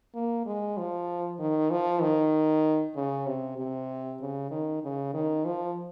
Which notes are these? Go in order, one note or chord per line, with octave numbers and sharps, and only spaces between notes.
A#3
G#3
F3
D#3
F3
D#3
C#3
C3
C3
C#3
D#3
C#3
D#3
F3